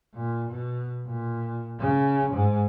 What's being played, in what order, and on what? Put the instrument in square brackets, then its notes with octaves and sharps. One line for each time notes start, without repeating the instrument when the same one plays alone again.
[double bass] A#2
B2
A#2
C#3
G#2